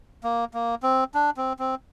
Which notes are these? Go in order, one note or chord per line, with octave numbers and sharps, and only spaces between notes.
A#3
A#3
C4
D4
C4
C4